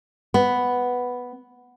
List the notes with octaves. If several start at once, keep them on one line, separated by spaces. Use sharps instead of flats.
B3